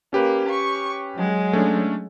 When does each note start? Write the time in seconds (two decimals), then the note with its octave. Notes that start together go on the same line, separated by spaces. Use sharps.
0.13 A#3 C#4 G4 B4
0.49 C#6
1.15 F#3 G#3
1.53 A3 C#4 D4